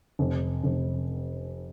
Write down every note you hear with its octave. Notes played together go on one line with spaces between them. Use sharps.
F1
F1